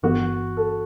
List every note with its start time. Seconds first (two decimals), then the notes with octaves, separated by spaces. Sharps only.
0.03 G1 G2 E3 B3 F#4
0.57 A4